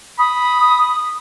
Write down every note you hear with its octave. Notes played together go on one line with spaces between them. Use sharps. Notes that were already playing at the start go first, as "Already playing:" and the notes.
B5 D#6